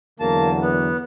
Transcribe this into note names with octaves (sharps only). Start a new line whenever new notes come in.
E2 D3 F#3 A#3 A5
B3